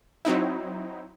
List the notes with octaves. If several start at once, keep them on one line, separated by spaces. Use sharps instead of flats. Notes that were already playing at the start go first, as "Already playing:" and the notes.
F#3 C4 D#4 E4